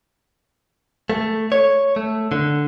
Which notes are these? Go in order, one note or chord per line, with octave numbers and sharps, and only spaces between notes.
A3
C#5
A3
D3